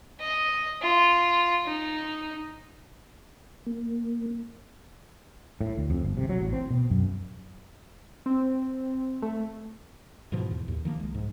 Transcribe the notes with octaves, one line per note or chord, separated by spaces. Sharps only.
D#5
F4
D#4
A#3
A2
D2
F2
G1
C3
F#3
A1
C4
B2
F#2
C4
A3
G#2 B2 E3 F3
E2
D#2 A2
D#3 F3 A#3
C2 G#3
G#2